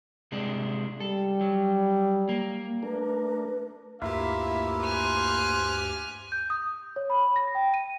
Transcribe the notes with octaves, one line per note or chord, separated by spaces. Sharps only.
C3 G#3 D4
G3 A4
F#3
A#3
A3 D4 A#4 B4
D2 G2 A#3 E4 F4 G4 E5
C5 G#5 F6 F#6
G6
D#6
C#5
B5
A#6
G5
D#7